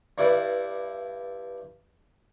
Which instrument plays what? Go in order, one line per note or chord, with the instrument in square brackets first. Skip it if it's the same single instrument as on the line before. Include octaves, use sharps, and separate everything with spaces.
[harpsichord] G2 G3 E4 B4 D5